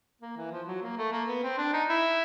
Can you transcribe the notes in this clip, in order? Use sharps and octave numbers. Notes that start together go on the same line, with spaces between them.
A#3
E3
F3
F#3
A#3
A3
A#3
B3
C4
D4
D#4
E4